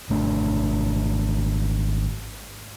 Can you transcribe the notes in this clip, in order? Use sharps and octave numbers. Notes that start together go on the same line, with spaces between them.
G#1 A3 D4